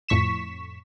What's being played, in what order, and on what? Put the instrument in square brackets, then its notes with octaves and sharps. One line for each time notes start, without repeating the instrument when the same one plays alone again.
[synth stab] F2 A2 C#6 B6 E7